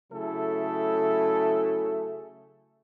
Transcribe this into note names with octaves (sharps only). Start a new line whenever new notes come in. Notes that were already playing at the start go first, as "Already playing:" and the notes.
C#3 F#3 A3 E4 G#4 A4